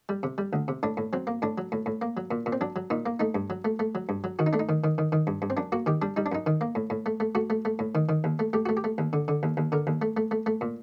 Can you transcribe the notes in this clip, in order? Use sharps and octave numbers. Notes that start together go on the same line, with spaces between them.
G3
C3
G3
D2
C3
A2 D4
A2
F#3 C4
A#3
A2 D4
F#3
A2
A2
A#3
F#3
A#2
A#2
C4
F#3 D4
F#3
A#2 D#4
A#3
A3 D#4
G2
F#3
A3
A3
F#3
G2
F#3
D#3 F#4
D#4
A3 D4
D#4
D#3
D#3
D#3
D#3
G2
G2
C4
F#2 D4
A#3 F#4
D#3 G4
G3 D4
G3 D#4
D4
F#2 D#4
D#3
A#3
A2
A2
A3
A3
A3 F#4
A3
A3
A2
D#3
D#3
D#2
A3
A3 G4
A3 F#4
G4
A3
D#2
D3
D3
D#2
D#2
D3 A#4
D#2
A3
A3
A3
A3
A#2